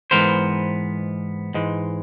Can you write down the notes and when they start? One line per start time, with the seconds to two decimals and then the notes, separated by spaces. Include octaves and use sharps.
0.11 G#2 E3 G#3 B3 A#4 C5
1.54 G#2 E3 G#3